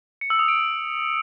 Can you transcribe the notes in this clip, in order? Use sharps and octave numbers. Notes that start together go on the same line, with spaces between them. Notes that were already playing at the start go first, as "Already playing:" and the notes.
C#7
E6
D#6
D7